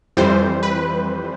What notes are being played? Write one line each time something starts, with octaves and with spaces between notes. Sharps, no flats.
F2 E3 G3 C5
B4